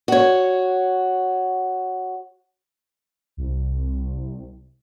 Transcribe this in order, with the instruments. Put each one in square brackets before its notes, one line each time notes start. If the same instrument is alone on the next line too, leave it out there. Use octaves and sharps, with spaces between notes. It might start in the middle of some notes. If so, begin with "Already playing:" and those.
[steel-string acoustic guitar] F#4 C#5
[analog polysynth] C2